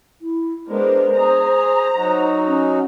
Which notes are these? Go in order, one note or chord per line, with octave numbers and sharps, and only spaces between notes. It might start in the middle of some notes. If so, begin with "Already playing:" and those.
E4
G#3 B3 D4 A#4 C5
G#4 A#5
F#3 D#4 F#4
C#4